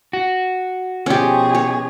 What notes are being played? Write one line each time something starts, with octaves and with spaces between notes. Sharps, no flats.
F#4
B2 F3 C#4 G4 G#4
C#5